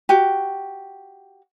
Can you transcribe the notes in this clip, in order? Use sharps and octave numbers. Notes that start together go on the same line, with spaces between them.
F#4 G4